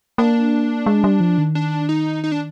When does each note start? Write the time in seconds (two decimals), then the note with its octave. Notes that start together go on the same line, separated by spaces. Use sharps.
0.18 A#3 D4
0.86 G#3
1.04 G3
1.20 F3
1.38 D#3
1.55 D4
1.89 D#4
2.24 D#4
2.32 D4